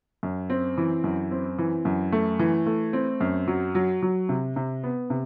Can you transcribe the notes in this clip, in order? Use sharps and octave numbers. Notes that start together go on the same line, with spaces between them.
F#2
C4
E3
F#2
C4
E3
F#2
A3
E3
A3
C4
F#2
F#3
F#3
F#3
C3
C3
B3
C3